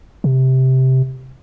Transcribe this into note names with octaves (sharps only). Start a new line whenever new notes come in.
C3